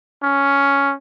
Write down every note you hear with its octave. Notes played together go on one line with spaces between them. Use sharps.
C#4